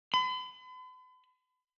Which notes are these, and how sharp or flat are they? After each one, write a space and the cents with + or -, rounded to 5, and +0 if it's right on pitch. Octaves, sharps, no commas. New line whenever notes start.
B5 +45